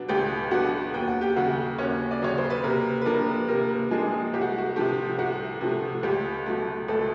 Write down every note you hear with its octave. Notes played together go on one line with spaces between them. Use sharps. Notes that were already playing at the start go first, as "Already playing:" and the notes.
Already playing: B2 F#3 B3 D4
C#2 G4 G5
B2 F#3 B3 D4 F#4 F#5
D#2 G5
F#5
G4 G5
C#3 F#3 F#4 F#5
D#2 C#4 C#5
D5
C#3 F#3 C#5
C5
B4
C3 A#3 A#4
B4
F3 A#3 D4 A#4
C3 A#3 A#4
F3 G#3 A#3 D4 G#4
C2 G4
F#4
F#4
C3 F3 A3 G4
C2 F#4
C3 F3 A3
C#2 G4
B2 F#3 A3
C#2 A3 A4